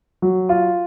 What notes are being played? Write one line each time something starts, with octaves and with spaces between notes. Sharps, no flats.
F#3
F4